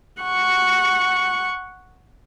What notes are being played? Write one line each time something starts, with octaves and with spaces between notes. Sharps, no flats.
F#5 C#6